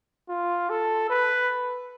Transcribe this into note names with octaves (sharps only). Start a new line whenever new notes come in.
F4
A4
B4